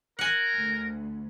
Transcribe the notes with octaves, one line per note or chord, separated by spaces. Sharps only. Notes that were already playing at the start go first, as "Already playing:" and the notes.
A#4 F#5 G#5
D2